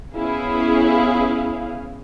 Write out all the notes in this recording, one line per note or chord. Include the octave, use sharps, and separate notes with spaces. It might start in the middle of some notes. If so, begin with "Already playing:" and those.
B3 C#4 E4 G#4 F5